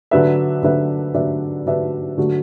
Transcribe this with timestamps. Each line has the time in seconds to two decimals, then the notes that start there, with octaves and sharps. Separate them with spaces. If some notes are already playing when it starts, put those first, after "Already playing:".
0.11 D3 F#3 D4 B4 E5
0.63 D3 F#3 D4 B4 E5
1.14 D3 F#3 D4 B4 E5
1.66 D3 F#3 D4 B4 E5
2.17 D3 F#3 A3 F#4